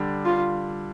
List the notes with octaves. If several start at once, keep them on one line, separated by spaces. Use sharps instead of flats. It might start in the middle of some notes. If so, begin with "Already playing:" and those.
Already playing: D3 G3 D4
F4